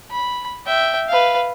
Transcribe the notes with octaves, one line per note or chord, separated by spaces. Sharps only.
B5
E5 G5
B4 F5